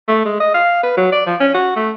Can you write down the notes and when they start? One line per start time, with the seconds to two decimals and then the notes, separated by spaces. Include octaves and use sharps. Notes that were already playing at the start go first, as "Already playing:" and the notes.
0.08 A3
0.25 G#3
0.40 D#5
0.54 F5
0.83 B4
0.97 F#3
1.12 D5
1.26 F3
1.40 C#4
1.54 F#4
1.76 A3